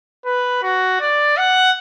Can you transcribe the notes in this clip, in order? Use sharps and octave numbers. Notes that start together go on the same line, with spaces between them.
B4
F#4
D5
F#5